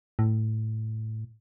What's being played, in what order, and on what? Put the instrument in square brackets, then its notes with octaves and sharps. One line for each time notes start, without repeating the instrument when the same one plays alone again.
[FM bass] A2